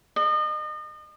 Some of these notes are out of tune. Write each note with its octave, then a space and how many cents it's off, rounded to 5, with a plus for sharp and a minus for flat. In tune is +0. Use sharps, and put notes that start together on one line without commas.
D#5 -35